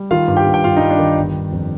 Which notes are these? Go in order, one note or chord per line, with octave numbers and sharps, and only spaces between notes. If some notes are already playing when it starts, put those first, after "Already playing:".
Already playing: G3
D#3 F4 F5
G2
G4 G5
G2
G5
G2 F4 F5
G3 D#4 D#5
D4 D5
D#3
G1
G1
F2